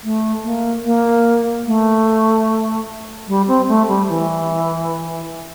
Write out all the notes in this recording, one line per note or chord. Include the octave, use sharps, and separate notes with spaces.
A3
A#3
A#3
A3
G3
C4
A3
G3
E3